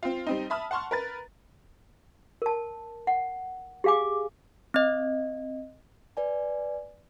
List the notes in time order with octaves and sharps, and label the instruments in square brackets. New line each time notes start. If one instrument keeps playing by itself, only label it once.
[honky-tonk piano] C4 F4
G3 C4 D#4
E5 A5 B5 D#6 F6
F#5 A5 C6 C#6 F6
A#4 B4 A6
[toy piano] A#4 A5
F#5
G4 G#4 F5 G#5 D6
[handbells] C4 D#5
[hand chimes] B4 D5 G#5